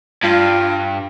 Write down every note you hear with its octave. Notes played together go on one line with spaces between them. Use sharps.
G2 F4